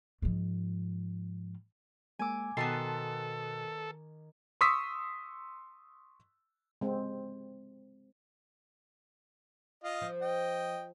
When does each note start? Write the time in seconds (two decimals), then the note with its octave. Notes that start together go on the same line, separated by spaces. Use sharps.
0.22 G#2 F3
2.19 G#3 A#3 G#5 D6 E6
2.57 B2 D#3 B3 F#4 A4 G5 A5 C6
4.61 C6 C#6 D#6 E6 B6
6.81 G#3 C4
9.83 F4 D#5 F5
10.02 F3
10.21 D#5 G5